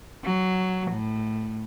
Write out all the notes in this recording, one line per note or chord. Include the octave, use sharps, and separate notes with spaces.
F#3
A2